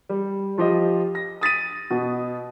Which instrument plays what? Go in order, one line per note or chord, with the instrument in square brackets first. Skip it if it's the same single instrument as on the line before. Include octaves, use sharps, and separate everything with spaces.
[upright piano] G3
F3 F4 G4 D#5
A#6
D#6 A6 B6 D#7
B2